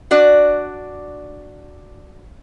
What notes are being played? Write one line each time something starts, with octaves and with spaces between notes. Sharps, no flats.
D4 F#4 D5